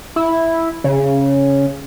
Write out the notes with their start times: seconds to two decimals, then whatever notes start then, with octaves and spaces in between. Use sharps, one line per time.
0.16 E4
0.84 C#3